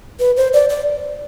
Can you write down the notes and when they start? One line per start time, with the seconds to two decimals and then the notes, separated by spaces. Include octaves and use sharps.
0.20 B4
0.37 C5
0.54 D5
0.70 D5